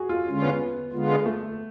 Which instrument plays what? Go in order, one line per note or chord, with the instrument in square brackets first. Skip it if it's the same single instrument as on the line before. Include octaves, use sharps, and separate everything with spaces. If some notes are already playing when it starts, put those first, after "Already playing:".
Already playing: [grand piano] F#4 G#4
F4
[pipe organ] D3 G#3 C#4 F4
[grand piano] B3
[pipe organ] D3 G#3 B3 F4
[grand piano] A3